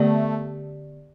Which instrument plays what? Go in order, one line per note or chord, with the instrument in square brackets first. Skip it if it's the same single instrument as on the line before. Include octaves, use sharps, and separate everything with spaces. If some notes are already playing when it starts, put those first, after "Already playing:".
Already playing: [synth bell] D3 B3 G4 D5 [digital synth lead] A3